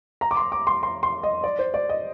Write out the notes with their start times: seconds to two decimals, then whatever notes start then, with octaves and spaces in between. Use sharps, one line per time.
0.21 A#5
0.31 D6
0.37 C6
0.52 D6
0.67 C6
0.83 C6
1.03 C6
1.23 D#5
1.44 D5
1.59 C5
1.74 D5
1.89 D#5